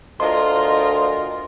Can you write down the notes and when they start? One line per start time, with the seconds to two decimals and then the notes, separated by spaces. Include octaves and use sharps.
0.20 D2 F4 A#4 D#5 C6